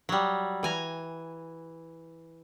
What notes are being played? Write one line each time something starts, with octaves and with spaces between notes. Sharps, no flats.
F#3 G3
E3 G#5 A#5